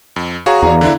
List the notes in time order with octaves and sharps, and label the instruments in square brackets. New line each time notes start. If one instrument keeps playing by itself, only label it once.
[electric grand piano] F2
[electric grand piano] F#4 G#4 C#5 [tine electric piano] F5 A#5
[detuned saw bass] E2 [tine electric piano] D5 F5 A#5
[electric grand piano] D3 D4 E4